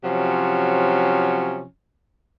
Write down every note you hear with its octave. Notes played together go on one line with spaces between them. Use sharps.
C3 F3 F#3 C#4